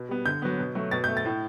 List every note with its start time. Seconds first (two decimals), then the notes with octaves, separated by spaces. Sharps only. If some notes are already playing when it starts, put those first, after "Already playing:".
Already playing: B2
0.09 G3 B3
0.26 D3 G6
0.42 F#3 B3
0.59 B2
0.75 F#3 A3
0.91 B2 A6
1.04 A3 G6
1.17 A6
1.25 A2